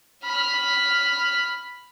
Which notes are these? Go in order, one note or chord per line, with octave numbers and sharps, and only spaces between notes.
B5 F6